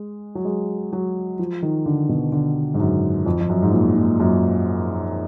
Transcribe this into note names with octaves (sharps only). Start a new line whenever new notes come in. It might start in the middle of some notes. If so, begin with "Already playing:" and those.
Already playing: G#3
F#3
G#3
F#3
F3
D#3
D3
B2
D3
G#2
F#2
F2
F2
F#2
G#2
A#2
A#2
F#2